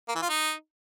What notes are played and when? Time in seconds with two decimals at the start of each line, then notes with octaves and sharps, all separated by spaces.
0.08 A#3
0.15 E3
0.22 F4
0.29 D#4